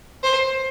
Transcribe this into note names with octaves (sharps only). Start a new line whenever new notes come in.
C5